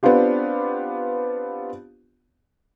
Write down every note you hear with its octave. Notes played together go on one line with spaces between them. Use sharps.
B3 C4 D4 F4 G4